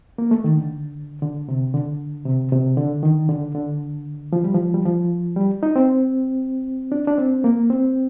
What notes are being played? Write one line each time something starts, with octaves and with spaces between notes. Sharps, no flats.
A#3
A3
D#3
D3
D3
C3
D3
C3
C3
D3
D#3
D3
D3
F3
G3
F3
G3
F3
G3
D#4
C4
D4
D4
C4
A#3
C4